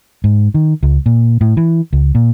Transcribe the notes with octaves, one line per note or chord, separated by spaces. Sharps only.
G#2
D#3
C#2
A#2
A2
E3
C#2
A#2